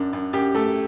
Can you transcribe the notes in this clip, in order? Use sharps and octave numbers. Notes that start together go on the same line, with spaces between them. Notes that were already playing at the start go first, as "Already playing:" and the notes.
Already playing: F#2 D4
F#2
F#2 G4
A3 A4